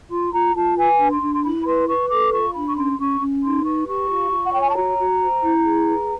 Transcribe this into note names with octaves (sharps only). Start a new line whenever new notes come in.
F4 C6
F4 A#5
F4 A5
B4 G#5
D4
C6
D4
C6
E4 B5
B4 C6
B4 C#6
A4 D6
F4 C#6
D4 B5
C#6
C#4 C6
C#4 C#6
C#4
D#4 C6
B4 C#6
G4 C#6
F4
F4
F#5
C#5 G5
G#5
A5
F#4 A#5
F#4
C5
E4
G#4
B4